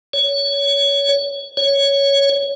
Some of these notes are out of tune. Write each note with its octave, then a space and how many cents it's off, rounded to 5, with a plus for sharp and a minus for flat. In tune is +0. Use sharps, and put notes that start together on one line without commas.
C#5 +20
C#5 +5